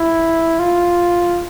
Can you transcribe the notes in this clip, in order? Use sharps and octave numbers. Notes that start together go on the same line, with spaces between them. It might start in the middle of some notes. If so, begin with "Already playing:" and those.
Already playing: E4
F4